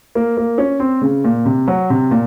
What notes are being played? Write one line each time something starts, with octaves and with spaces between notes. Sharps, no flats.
A#3
A#3
C#4
C4
C#3
A#2
C3
F#3
C3
A#2